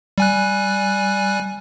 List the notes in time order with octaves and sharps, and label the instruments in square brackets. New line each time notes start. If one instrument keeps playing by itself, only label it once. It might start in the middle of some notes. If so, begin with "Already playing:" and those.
[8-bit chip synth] G3 G#5 F#6